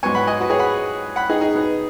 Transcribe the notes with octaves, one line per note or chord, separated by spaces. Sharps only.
G#2 F#3 B3 G#5 C#6
F#5 B5
D#5 G#5
F#4 B4
G#4 C#5
F#5 B5
F#5 B5
D#4 G#4
D#4 G#4
B2 B3